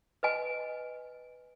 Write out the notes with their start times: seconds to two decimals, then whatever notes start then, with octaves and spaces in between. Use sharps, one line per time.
0.23 B4 D#5 G#5